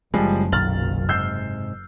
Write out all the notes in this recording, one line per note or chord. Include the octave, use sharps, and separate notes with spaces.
F#1 F#2 C#3 F3 G3 G#3
B1 A#2 D#3 F6 A6 F#7
G#2 C3 E6 G6 C7